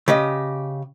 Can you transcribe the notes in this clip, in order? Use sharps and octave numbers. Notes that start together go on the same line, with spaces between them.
C#3 G4 D#5